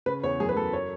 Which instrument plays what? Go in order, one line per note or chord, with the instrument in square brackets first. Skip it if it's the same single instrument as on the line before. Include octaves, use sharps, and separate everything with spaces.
[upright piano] C#3 B4
E2 C#5
F#2 G#4
B4
F#2 A4
C#5